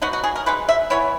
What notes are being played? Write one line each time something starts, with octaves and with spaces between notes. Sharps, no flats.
F#3 B3 D#4 F#4
F#4
G#4
A#4
B2 G#3 D#4 B4
E5
E3 B3 E4 C#5